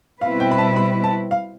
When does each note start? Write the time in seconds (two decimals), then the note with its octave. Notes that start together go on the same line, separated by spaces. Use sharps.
0.21 B2 G3 C4 E4 B4 F5
0.40 G5
0.51 B5
0.58 A5
0.76 B5
1.04 A5
1.31 F5